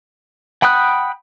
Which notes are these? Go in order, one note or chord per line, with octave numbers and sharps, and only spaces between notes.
F#5 G5 B5 D#6 F#6